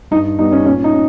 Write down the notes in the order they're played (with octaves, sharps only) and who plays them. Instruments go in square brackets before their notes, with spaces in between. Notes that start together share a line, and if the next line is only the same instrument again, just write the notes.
[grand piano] G2 D#4
G3 B3 D#4
C#4
A#2 C#4
D#4
C#4